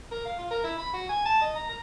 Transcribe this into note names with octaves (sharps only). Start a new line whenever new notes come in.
A#4
F5
F4
A#4
E4
B5
F#4
G#5
A5
D#5
A#5
A#5